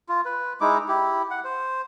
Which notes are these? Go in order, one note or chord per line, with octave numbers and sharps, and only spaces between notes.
F4
B4
G#3 D#4 E4 D6
E4 G4
F#5
C5